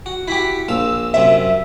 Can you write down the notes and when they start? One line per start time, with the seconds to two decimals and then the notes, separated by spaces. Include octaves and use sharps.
0.06 F#4
0.28 E4 F#4 G4 B6
0.68 A#1 F5 E6
1.14 F#2 C3 E5